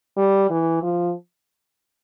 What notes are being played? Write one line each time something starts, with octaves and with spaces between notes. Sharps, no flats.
G3
E3
F3